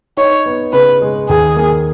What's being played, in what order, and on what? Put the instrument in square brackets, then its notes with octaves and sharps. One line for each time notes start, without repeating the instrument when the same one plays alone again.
[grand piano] D#4 [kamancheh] C#5
[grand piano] B3
[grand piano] C#3 [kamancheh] B4
[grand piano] G#3
[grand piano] D#2 [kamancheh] G#4
[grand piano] A#3